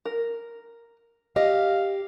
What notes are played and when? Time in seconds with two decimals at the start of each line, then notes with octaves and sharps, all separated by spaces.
0.05 A#4
1.36 G4 D#5 F5